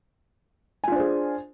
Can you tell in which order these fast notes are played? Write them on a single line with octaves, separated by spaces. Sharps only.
G#5 F4 D4 C5 G#4